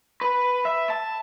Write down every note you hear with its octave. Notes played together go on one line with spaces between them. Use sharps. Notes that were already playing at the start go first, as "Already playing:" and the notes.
B4
E5
A5